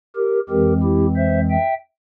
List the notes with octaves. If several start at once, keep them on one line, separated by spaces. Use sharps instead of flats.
G4 A#4
F2 E3 G#3 C4 G4 A#4
E4 G4
C5 E5
E5 G5